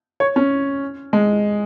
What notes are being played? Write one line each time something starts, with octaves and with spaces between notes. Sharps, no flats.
C#5
C#4
G#3